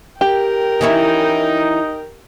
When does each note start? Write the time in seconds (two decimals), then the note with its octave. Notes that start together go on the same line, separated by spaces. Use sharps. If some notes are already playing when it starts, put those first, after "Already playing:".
0.21 G4 A#4 G5
0.81 E3 C#4 D#4 E4